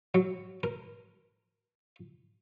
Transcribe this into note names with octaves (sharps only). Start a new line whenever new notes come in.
F#3
A#4